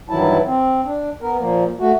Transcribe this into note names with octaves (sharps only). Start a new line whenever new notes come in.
G2 D#3 E3 F#3 E4 A5
C4
D4
B3 A#4
A#2 F3 A#3
A3 F#4